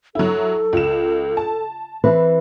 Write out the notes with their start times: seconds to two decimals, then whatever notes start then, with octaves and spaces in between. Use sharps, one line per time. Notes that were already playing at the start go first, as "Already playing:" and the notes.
0.15 F#3 E4 A4
0.73 C#2 E7
1.37 A5
2.04 E3 C4 B4